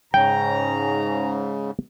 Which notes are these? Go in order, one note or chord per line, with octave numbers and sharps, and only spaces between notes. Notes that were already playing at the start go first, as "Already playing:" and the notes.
G#2 C#3 C#4 G5 A#5